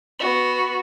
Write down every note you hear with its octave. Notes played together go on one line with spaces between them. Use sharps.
B3 F#4